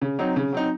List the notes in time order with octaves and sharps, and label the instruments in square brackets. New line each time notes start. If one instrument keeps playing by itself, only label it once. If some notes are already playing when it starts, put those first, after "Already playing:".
[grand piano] C#3
F#3 C4 D#4
C#3
F#3 C4 D#4